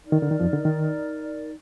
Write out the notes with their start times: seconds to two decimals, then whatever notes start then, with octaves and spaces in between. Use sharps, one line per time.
0.03 D#4 A#4 D5
0.12 D#3
0.22 D3
0.31 D#3
0.40 F2 F3
0.53 D3
0.65 D#3